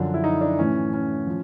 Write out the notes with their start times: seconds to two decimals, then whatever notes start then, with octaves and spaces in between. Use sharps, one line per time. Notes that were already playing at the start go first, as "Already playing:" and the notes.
Already playing: F#2 D3 F3 D4
0.14 E4
0.24 D#4
0.41 D4
0.59 A2 E3 C#4
0.93 C#4
1.27 F3